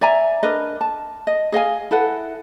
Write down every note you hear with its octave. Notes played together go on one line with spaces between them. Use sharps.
D5 E5 G#5 A#5
D4 A#4 B4 D#5
A5
D#5
G#4 D#5 F5 G#5
E4 A4 B4 F#5